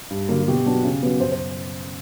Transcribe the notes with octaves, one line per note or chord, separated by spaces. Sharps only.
G2
D3 F#3 A#3
F#4
B2 G4
F#3 B3 D4
C#3
F#3 B3
F#2 C5
C5